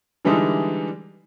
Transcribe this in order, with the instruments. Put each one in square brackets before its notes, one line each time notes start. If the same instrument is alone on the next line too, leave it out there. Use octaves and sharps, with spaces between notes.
[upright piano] D3 E3 G3 G#3 D4 D#4